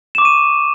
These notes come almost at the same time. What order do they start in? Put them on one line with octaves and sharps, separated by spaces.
E7 D6 C#6 D#7